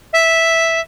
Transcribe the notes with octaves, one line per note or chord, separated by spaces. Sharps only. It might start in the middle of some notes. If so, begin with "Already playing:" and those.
E5